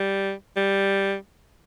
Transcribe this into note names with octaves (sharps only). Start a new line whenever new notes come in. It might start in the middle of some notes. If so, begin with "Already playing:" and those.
Already playing: G3
G3